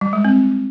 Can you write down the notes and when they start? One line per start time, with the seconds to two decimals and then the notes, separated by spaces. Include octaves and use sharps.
0.01 G3
0.13 G#3
0.25 C4